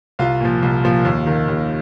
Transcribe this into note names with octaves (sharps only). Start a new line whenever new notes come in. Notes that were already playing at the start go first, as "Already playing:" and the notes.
C2 F4 F5
A#2 F3
C2
A#2 F3
D#2
D#3
D#2